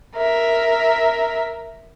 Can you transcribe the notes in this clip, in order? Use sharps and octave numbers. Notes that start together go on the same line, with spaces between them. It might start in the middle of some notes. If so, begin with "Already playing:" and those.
A#4 E5